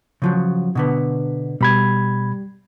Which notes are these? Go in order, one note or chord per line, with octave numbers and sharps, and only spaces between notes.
C#3 F3 F#3
B2 D3 B3
B2 G3 B5 G#6